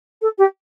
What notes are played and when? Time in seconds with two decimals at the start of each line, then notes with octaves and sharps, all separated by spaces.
0.21 A4
0.38 G4